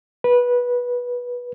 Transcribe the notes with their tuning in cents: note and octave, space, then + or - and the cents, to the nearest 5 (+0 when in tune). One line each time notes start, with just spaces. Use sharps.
B4 -15